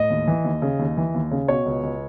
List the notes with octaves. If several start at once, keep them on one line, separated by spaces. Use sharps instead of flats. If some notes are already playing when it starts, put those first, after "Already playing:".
Already playing: A2 D#5
D#2
E3
D#2
C#3
D#2
E3
D#2
C#3
B2 C#5
C#2
C#2